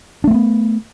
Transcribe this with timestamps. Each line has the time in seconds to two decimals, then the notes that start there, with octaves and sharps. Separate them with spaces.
0.24 D4
0.27 A3
0.31 C4
0.34 B3